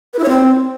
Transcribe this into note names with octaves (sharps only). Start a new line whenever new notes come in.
B4
E4
C#5
C4